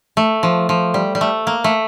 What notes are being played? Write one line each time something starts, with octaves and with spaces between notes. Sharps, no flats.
A3
F3
F3
G3
G3
A3
A#3
A3